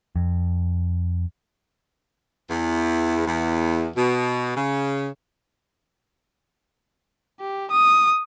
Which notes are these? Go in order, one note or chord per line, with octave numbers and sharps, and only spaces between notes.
F2
E2
E2
B2
C#3
G4
D#6